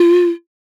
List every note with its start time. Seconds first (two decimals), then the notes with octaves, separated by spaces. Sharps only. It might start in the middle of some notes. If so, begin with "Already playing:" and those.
Already playing: F4